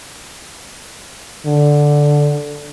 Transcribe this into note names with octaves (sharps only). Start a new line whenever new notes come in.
D3